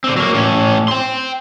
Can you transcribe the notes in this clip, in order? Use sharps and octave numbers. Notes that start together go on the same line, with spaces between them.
D3 C4
F#3 A#3
A2 C#4
G5 C6